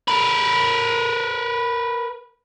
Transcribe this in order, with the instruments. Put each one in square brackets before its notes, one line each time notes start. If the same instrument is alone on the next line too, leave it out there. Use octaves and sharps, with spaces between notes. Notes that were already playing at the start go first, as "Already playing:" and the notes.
[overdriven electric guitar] A#4 B4